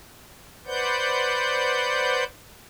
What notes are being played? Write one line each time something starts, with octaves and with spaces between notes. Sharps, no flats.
B4 C5 D5 F#5 G6